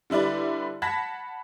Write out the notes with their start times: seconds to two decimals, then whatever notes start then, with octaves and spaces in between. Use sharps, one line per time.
0.10 D3 G3 E4 B4 D5
0.82 F#5 A5 B5 G#6 A#6 B6